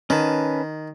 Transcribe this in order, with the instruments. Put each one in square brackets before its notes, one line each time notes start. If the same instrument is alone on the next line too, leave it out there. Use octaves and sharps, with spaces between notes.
[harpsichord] D#3 [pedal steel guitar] C#4 B4 A5